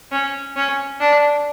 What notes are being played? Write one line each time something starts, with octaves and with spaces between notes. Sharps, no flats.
C#4
C#4
D4